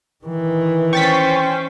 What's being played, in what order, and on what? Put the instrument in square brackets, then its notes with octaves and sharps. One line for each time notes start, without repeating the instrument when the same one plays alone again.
[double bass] D#3 E3
[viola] C#4 C5 [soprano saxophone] G5 [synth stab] C#6 A6 B6